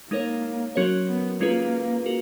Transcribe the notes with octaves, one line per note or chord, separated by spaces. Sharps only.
G#3 A#3 D#4 A#4 C#5
F#3 C#4 F#4 A#4 C#5
B3
G#3 A#3 C#4 F4 G#4 B4
F#4 A#4